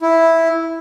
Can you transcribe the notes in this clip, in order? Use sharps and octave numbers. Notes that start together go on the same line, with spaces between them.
E4